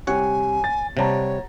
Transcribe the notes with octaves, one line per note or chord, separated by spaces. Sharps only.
C3 G3 C#5 F#5 G#5
A6
C3 G3 C#5 F#5 A5 A#5